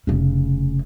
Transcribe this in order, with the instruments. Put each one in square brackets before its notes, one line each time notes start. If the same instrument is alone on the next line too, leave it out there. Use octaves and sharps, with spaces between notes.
[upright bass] F1 C#3